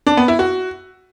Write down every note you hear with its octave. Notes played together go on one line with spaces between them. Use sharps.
D4
B3
E4
F#4